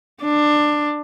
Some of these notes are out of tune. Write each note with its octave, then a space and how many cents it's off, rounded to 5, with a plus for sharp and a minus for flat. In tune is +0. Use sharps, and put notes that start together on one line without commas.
D4 +15